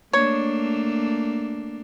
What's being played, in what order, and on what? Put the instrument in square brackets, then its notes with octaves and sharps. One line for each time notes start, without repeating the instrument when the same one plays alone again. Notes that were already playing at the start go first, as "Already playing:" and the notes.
[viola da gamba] A3 A#3 D4 [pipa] C#5